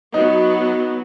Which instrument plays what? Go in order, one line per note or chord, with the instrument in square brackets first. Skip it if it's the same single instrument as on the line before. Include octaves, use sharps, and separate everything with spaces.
[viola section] F#3 B3 [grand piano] D#4